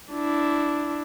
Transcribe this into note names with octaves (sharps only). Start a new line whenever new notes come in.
D4 E4